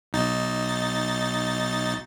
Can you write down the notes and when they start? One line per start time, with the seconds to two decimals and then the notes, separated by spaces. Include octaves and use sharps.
0.13 B1 D#4 A6